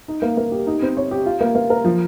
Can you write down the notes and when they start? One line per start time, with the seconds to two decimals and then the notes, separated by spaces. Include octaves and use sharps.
0.08 D#4
0.22 A#3
0.37 A#3
0.52 G4
0.67 D#4
0.82 C4
0.97 C#5
1.11 G4
1.26 F4
1.41 A#3
1.55 A#3
1.70 A#4
1.85 F3